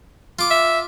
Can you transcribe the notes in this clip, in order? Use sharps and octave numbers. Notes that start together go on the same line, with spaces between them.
F4 D6
E5